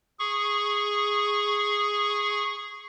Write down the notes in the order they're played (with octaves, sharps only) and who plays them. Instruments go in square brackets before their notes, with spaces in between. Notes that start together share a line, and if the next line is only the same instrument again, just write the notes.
[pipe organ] G#4 C#6